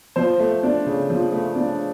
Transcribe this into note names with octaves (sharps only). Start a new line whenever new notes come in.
F3 C5
A3
D4
C#3
F3
A3
D4